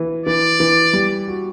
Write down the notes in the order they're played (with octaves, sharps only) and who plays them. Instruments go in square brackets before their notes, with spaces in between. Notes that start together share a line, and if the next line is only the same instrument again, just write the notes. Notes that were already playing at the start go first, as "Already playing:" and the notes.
Already playing: [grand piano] E3
[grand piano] E3 [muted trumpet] D5
[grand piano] E3
G3
F#4